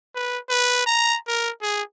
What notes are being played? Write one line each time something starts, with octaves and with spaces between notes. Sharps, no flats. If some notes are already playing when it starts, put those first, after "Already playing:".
B4
B4
A#5
A#4
G#4